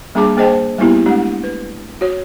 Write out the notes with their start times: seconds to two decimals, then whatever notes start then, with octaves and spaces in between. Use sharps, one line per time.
0.15 G3 A#3 D4 G#4 A5 D6
0.37 A#3 G#4 C5 D#5 G5 A5
0.78 G3 A#3 B3 E4 G4
1.06 G#3 A3 D4 G4
1.44 B4
2.01 F#4 C#5